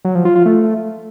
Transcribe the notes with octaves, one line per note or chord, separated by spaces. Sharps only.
F#3
F3
F4
F4
A3